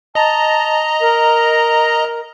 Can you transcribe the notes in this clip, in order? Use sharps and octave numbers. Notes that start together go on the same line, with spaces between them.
D#5 A5 A#5
A#4